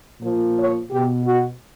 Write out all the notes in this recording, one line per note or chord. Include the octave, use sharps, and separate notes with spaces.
A#2 F3
C#5
B2 G4
F#4